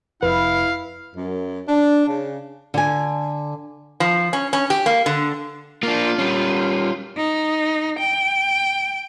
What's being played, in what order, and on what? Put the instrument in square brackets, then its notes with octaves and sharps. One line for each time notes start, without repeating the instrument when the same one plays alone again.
[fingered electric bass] F1 [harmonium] E4 [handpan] B4 [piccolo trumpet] F5
[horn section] F#2
D4
C#3
[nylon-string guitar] D3 G#5
[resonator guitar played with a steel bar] F3
C#4
C#4
G4
A#3
D3
[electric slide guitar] A#3 D4 [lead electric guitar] F4
[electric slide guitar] G3 C#4
[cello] D#4
G5